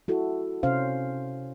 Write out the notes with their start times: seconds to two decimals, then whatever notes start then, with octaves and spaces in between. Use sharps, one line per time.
0.08 E4 F#4 A4
0.63 C3 C#4 C5 F5